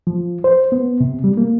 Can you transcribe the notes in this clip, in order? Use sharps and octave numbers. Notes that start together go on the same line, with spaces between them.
F3
C5
B3
C3
G3
A#3